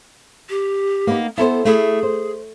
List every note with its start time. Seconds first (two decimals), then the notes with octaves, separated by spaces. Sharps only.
0.50 G4
1.07 A#3 B3 D#4
1.38 B3 E4 A4 C5
1.65 A3 E4 G#4
2.03 C5